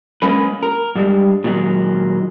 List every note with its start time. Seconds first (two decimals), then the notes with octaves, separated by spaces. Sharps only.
0.22 G#3 A#3 C#4 B4
0.63 A#4
0.95 G2 G3 G#3
1.44 A#2 D#3 F#3 G#3